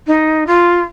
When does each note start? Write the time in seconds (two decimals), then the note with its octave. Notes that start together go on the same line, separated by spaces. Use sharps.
0.07 D#4
0.46 F4